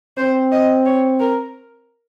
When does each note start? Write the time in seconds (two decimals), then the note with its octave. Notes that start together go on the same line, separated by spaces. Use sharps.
0.17 C4 C5
0.52 D#5
0.86 C#5
1.20 A#4